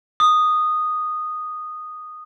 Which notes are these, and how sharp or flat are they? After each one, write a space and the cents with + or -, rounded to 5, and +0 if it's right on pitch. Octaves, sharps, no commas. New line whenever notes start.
D#6 -10